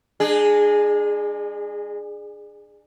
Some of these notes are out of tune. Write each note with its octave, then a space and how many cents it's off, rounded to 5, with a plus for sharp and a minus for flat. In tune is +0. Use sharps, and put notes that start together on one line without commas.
G#3 -25 D4 +25 G#4 +0